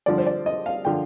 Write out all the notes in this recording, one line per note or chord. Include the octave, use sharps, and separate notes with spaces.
G2 D3 F3 D5
C5
D5
D#5
F5
D3 F3 G5